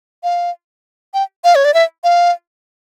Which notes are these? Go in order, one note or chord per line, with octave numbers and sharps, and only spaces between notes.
F5
G5
F5
C#5
D5
E5
F5